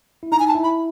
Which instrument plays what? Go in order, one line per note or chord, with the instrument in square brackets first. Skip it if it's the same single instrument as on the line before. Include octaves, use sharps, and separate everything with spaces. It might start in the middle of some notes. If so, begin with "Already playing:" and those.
[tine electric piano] E4
[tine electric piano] D#4 [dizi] A#5
[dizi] G#5
A5
[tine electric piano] E4
[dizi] B5